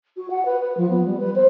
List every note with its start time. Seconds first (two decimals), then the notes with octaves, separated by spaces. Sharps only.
0.17 F#4
0.30 F#5
0.46 B4
0.60 B4
0.77 F3
0.90 B3
1.06 G3
1.20 B4
1.35 C5